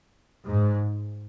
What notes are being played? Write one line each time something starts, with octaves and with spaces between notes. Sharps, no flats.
G#2